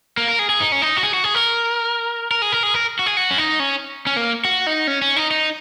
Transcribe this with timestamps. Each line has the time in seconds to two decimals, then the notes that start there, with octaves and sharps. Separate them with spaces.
0.17 A#3
0.28 A#4
0.39 G#4
0.49 G#4
0.60 D#4
0.72 C#4
0.82 D#4
0.97 F#4
1.03 G#4
1.14 F#4
1.24 G#4
1.35 A#4
2.31 A#4
2.42 G#4
2.52 A#4
2.63 G#4
2.74 A#4
2.99 F#4
3.06 G#4
3.17 F#4
3.31 C#4
3.38 D#4
3.60 C#4
4.07 C#4
4.16 A#3
4.45 F#4
4.67 D#4
4.87 C#4
5.02 C#4
5.16 D#4
5.31 D#4